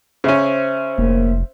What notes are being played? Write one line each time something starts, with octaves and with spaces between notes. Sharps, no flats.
C#3 C#4 C5 E5
F1 A#3